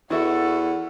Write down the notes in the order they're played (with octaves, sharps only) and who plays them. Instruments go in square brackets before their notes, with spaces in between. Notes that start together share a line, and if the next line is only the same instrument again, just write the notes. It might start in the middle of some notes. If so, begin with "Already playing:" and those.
[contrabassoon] E2 [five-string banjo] E4 F#4 E5 [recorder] A4 [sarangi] F#5